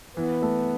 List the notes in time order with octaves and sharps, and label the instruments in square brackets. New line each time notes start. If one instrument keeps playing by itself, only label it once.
[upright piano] E3 [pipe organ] B3
[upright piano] A3